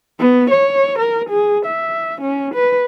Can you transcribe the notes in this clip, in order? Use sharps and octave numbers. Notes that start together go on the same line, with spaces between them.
B3
C#5
A#4
G#4
E5
C#4
B4